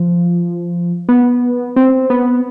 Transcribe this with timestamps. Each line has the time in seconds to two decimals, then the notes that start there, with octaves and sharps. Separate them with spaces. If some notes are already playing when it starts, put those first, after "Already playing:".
Already playing: F3
1.09 B3
1.76 C4
2.10 B3